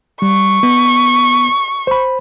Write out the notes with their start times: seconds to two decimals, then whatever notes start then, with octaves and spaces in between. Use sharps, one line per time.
0.22 G3 C#6
0.63 B3
1.87 C5 B5